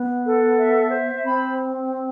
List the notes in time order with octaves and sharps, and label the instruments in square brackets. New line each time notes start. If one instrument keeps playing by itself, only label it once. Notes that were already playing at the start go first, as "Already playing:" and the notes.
Already playing: [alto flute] B3
[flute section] A4
E5
C5
[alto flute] C4 [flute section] B5